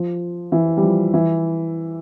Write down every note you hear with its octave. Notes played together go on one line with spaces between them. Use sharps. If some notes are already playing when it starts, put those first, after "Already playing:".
Already playing: F3
E3
G3
F3
E3